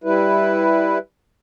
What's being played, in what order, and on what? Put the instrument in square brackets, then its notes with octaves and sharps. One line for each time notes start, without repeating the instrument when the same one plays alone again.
[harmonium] G3 E4 B4